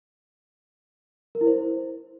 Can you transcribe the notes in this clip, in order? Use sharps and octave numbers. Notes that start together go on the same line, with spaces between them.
A#4
E4
C5